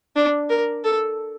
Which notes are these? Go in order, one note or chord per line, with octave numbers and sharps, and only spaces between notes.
D4
A#4
A4